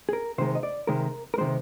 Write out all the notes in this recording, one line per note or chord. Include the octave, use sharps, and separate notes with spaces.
G#4
A#4
C3 D#3 G#3 C5
D#5
D5
C3 D#3 G#3 A#4
A#4
C3 D#3 G#3 C5